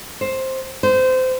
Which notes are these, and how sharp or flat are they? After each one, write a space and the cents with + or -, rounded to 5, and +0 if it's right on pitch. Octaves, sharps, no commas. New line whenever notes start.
C5 +10
C5 -25